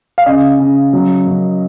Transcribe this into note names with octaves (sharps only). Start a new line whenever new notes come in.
F5
C#3 D#5
C#3
F#3
F#2